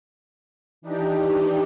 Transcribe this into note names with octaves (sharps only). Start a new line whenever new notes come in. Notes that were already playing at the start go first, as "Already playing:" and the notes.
E3 D4 D#4 G4